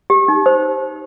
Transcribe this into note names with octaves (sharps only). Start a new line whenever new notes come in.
G4
D#4
C5